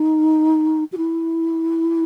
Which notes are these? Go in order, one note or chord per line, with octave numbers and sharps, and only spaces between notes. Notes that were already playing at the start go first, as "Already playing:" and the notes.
Already playing: D#4
F#4
E4